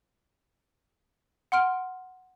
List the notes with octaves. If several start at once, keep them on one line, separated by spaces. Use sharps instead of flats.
F#5 C6 F6 D7